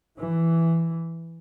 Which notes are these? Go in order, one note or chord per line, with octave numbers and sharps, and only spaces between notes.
E3